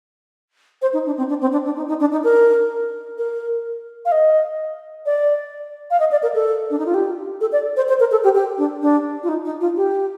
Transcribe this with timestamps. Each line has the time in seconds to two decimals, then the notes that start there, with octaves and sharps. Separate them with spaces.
0.82 C5
0.93 D#4
1.06 D4
1.18 C4
1.29 D4
1.41 C4
1.52 D4
1.65 D4
1.76 D#4
1.88 D#4
2.00 D4
2.12 D#4
2.24 A#4
3.18 A#4
4.05 F5
4.12 D#5
5.06 D5
5.91 F5
6.00 D#5
6.11 D5
6.23 A#4
6.35 A4
6.71 D4
6.79 D#4
6.86 F4
6.94 G4
7.41 A4
7.52 D5
7.77 C5
7.88 C5
8.00 A#4
8.12 A4
8.24 G4
8.35 G4
8.58 D4
8.82 D4
9.23 F4
9.29 D#4
9.45 D#4
9.61 F4
9.77 G4